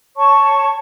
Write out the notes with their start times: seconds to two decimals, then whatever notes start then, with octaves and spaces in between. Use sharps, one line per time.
0.17 C#5 A5 C#6